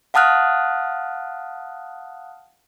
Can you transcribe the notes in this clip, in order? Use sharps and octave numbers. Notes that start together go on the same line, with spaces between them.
F5 F#5 A5 D#6 F6 F#6